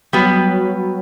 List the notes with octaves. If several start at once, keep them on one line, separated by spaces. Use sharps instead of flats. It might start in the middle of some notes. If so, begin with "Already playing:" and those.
F#3 G3 B3